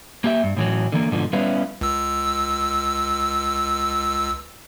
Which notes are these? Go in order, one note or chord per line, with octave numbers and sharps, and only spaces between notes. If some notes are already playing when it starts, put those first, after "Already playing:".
A#3 G4 E5
G2
A2 E3 F#3
D3 E3 A#3
G#2 B2 D3 F3
G3 B3 C#4 E4 B4 F5
C#2 E6